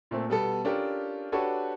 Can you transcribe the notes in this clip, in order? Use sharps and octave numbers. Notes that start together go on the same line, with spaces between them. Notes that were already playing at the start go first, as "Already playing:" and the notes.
A#2 A3 C4
B2 G3 B3 A4
C#4 D4 F4 G4 A4 A#4
D4 F#4 G4 A4 B4 C#5